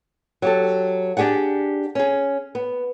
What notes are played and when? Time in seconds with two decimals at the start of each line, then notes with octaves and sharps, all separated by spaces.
0.42 F#3 G4 A4
1.17 D4 G4 G#4 D5 F#5
1.95 C#4 G#4
2.55 B3